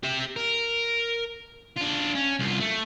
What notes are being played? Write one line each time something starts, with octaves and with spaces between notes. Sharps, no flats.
G4 E5
A#4
D4 F4
C#4
C2 F4
A3